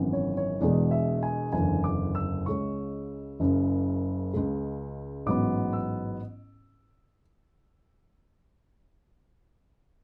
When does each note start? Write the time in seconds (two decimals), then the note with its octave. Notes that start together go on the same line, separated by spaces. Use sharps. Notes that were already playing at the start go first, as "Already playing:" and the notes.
Already playing: G#1 F#2 C#3 E3 B3
0.13 C#5
0.37 C#5
0.60 E1 E2 B2 G#3 D5
0.91 E5
1.23 G#5
1.53 F#1 E2 D3 G#5
1.84 D6
2.15 E6
2.46 C#2 C#3 G#3 C#4 C#6
3.40 F#1 F#2 C#3
4.33 C#2 C#3 G#3
5.26 A1 G#2 F#3 B3 D6
5.73 E6